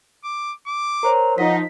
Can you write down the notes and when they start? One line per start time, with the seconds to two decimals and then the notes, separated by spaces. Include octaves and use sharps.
0.24 D6
0.67 D6
1.03 A#4 C5 C#5 A#5
1.38 F3 D#4 D#5 F#5 B6